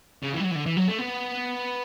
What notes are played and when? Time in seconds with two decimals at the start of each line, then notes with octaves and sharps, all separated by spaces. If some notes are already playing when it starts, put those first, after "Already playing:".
0.22 C#3
0.33 E3
0.40 G3
0.44 F#3
0.51 E3
0.55 D3
0.66 E3
0.77 F#3
0.88 A3
0.99 B3